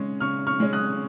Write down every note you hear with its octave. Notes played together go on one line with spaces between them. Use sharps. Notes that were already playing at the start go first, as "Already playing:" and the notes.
Already playing: C#3 G#3 C#4
C#3 C#6 F6
C#6 F6
G#3 C#4
D#6 F#6